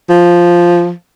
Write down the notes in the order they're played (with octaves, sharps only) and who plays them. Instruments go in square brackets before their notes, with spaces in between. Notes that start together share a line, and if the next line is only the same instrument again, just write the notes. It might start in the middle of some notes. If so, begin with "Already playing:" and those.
[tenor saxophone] F3